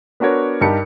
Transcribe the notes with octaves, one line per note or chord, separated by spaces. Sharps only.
B3 D4 F#4 A#4 C#5
G2 D#4 G4 A#4 A5 C#7